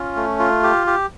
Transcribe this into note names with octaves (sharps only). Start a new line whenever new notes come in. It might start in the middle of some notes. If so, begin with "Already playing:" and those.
Already playing: C#4 F4
A3
F4
G4
G4